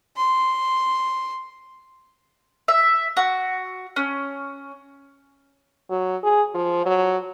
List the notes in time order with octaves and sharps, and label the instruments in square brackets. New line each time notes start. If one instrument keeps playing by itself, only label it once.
[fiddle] C6
[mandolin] E5
F#4
C#4
[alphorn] F#3
G#4
F3
F#3